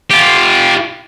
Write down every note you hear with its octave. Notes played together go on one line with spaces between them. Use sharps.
F4 G4